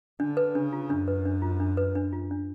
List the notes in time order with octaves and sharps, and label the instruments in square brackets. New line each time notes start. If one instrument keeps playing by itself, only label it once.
[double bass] D3 [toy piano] D4
[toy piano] B4
[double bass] C#3 [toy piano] D4
[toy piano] F4
[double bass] F#2 [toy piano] D4
[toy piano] B4
D4
F4
D4
B4
D4
F4
D4